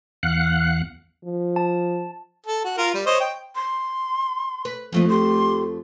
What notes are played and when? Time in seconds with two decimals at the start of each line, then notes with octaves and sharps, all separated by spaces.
0.23 E2 F5 F#5 F#6
1.24 F3
1.56 A5
2.46 A4
2.64 F#4
2.78 F4 A#4
2.94 G3
3.06 C5 C#5 D#5
3.20 G5
3.56 C6
4.65 B4
4.92 F2 F3 A3 D#5
5.10 G4 C6